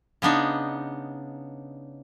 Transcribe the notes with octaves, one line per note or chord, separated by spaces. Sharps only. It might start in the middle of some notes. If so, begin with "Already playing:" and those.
C#3 B3 D4 D#4